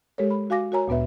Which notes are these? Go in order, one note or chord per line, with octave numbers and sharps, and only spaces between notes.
G#3 G4 A4 A#4 C#5
B5
F#4 F5 G#5 D6 A#6
F#4 A#4 C#5 G#5 A#5
D2 A#2 B3 B4 E5